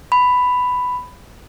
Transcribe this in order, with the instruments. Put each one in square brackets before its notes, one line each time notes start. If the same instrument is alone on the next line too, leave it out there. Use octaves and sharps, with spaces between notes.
[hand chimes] B5